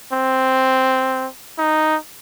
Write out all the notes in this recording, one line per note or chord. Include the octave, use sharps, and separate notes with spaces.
C4
D#4